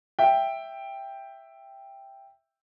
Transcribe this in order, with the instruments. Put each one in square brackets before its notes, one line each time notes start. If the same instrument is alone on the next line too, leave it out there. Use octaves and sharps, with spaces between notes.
[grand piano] E5 G5